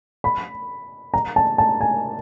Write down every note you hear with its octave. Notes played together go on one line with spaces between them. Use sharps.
B5
A#5
A5
A5
G#5